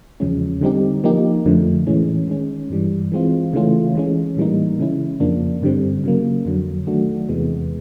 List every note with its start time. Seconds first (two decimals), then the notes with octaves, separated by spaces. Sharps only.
0.20 E2 C#3 F3 G#3 C#4
0.61 D3 G3 C4 D#4 G4
1.04 F3 A#3 D#4 G4
1.45 F2 D3 F3 A3
1.87 A2 E3 G#3 C#4
2.28 D#3 G#3 C#4
2.70 G2 E3 G3
3.12 E3 G#3 C4 F4
3.53 C#3 E3 A3 C#4 F4
3.95 E3 G#3 C#4
4.37 A2 E3 G3 A#3 D#4
4.79 C#3 E3 G#3 C#4 E4
5.20 F2 C#3 F3 A#3 D4
5.62 G2 D3 G3 C4
6.04 C#3 F#3 A#3
6.45 F2 D3 F#3
6.87 D#3 F#3 A3 D4 F#4
7.29 E2 C3 E3 G#3 B3